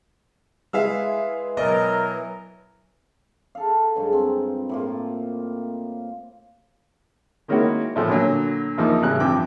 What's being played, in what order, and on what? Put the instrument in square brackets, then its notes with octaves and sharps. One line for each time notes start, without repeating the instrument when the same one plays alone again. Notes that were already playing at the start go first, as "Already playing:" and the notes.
[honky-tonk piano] G#3 E4 G#4 [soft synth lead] B4 [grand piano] E5 F5 E6
[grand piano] B2 D5 D#5 [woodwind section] E3 F#3 A#4
[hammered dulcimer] A4 F5
G2 F#3 G#3 D#4
C4 F4
A2 A#3 F4
[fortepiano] D#3 G#3 A#3 C#4 E4 F#4
A2 E3 F3 A3 B3
A#2 D3 F#3
E2 F3 A#3 D#4
A1 E2 C#3 G3 F#6
G2 E3 F3 C4 G5 D6